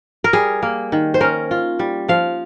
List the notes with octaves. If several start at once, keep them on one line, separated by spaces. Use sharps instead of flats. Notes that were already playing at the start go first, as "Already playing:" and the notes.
A#4
G3 G#4
A#3
D#3
C5
C#4 A#4
F4
G3
F3 F5